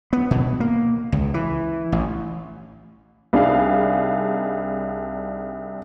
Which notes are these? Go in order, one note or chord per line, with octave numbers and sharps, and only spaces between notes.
B3
B2
A#3
C#2
E3
A1
C2 D4 D#4 G#4 F5